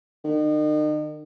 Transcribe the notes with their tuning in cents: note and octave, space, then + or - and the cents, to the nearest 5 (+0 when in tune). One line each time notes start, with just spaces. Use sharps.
D#3 -40